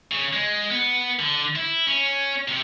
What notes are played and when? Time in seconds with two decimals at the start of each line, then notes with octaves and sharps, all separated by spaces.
0.12 C#3
0.33 G#3
0.70 B3
1.19 D3
1.56 E4
1.87 C#4
2.48 C3